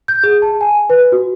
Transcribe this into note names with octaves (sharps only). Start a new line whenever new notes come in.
G6
G#4
A5
G#5
B4
F#4